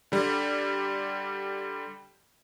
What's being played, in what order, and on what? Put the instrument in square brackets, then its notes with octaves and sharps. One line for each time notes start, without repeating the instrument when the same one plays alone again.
[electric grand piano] D3 G3